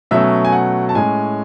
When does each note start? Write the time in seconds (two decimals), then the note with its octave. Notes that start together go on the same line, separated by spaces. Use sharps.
0.11 B2 F#3 A3 C#4 E5
0.45 G#5
0.52 F#5
0.89 A5
0.95 A2 G#3 C#4 G#5